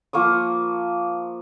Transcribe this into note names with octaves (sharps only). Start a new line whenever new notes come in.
F3 A#3 C#6 D#6